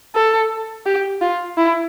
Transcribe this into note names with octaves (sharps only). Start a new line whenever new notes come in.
A4
G4
F4
E4